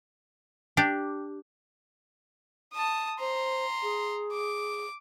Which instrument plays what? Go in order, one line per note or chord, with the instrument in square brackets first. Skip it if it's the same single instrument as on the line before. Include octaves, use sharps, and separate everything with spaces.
[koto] D4 G4
[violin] A5 D#6
[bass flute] C5 [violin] A#5 C6
[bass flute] G#4
[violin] D6